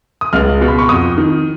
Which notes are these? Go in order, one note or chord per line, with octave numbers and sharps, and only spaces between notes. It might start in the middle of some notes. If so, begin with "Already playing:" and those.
D#6
C#2 F6
B2
B5
C#6
F2 D#6
D#3